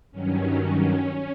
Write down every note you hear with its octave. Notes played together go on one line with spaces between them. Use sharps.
G2 D#3 F#3 C#4